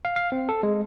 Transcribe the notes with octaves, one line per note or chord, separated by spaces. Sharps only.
F5
F5
C4
A4
G#3